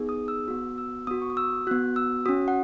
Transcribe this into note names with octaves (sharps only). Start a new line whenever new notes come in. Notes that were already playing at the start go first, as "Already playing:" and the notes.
Already playing: B3 D#4 G#4
D#6
E6
B3 F#4 E6
E6
B3 F#4 D#6
C#6
D#6
E6
B3 F#4 F#6
E6
C#4 F#4 D#6
F#5